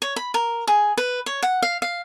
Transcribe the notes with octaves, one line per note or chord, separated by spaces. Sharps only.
C#5
B5
A#4
G#4
B4
C#5
F#5
F5
F5